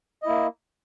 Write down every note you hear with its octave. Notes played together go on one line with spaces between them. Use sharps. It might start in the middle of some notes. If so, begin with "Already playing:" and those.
A#3 E4 D#5